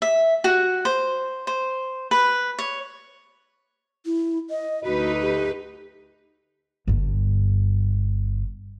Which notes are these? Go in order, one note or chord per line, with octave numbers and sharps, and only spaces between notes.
E5
F#4
C5
C5
B4
C#5
E4
D#5
D2 D#4 F#4 B4
G4
G1 G2